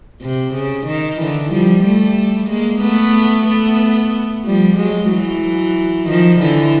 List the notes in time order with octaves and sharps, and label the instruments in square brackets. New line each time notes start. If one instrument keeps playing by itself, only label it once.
[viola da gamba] C3
C#3
D#3
D3 E3
F3 G3
G3 A3
G#3 A#3
A3 B3
A3 B3
F3 G3
F#3 G#3
E3 F#3
D#3 F3
D3 E3